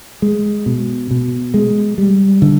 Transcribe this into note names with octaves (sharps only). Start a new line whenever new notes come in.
G#3
B2
B2
G#3
G3
D3